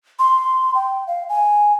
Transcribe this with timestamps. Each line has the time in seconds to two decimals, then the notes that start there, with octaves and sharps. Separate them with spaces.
0.19 C6
0.75 G5
1.07 F5
1.29 G#5